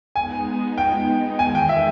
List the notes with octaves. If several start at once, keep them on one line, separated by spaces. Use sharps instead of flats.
G#3 B3 D#4 G#5
G5
E2 D#3 G#3 G#5
G5
E5